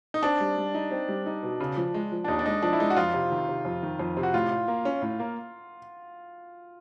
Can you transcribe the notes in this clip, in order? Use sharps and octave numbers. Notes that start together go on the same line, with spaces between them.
D#4
C4 D4
G3
G3
D#4
C4
G3
D#4
B2
C#3
F3
G#3
F3
D4
D#2 D#4
D4
G#3 D#4
F3 D4
E4
G#3 D#4
F#4
F2 F4
C3
D#3
C3
F2
D#3
F2
C3
F#4
A2 F4
A2
A#3
C#4
A2
A#3